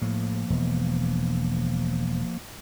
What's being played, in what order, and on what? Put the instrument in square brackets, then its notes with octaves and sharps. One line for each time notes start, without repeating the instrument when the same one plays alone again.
[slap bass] A2 [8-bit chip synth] F3 A#3
[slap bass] E1